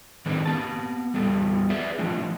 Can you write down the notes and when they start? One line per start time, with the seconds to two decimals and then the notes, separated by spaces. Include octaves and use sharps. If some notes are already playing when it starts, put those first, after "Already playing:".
0.26 D#3 G#3 C4 D4 B4
0.46 A#3 B3 A5
1.14 E2 G3 B3 A4
1.70 G#4 B4 D5 E5
1.98 E3 F3 A3 D4